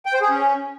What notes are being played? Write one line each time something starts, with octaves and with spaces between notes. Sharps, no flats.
G5
C5
G#4
C#4